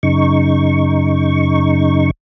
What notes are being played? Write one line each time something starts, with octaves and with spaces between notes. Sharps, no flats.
F#2 C#3 D#4 C#6